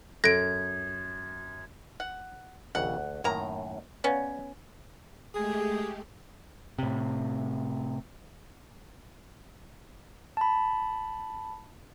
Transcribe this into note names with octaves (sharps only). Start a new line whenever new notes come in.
F#2 A4 G#6 A#6 D7
F#5
A#1 D#2 C#3 F#5
D2
F#2 A2 D#3 A#3 A#5
B3 C#4 C#5 D5 F5
G#3 A3 G4 G#4
A2 C3
A5 B5